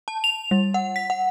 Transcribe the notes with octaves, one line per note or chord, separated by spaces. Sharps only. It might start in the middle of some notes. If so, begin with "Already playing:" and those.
A5
F7
G3
F#5
B6
F#5